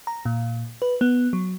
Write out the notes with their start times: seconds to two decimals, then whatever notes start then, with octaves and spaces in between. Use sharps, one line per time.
0.07 A#5
0.25 A#2
0.82 B4
1.01 B3
1.33 F#3